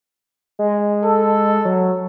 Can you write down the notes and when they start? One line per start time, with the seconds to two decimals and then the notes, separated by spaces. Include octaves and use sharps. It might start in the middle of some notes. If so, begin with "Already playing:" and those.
0.59 G#3
1.04 A4
1.65 F#3